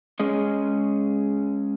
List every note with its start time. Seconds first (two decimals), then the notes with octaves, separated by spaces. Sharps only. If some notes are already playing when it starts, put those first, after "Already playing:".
0.20 G#3 C#4 G#4 D#5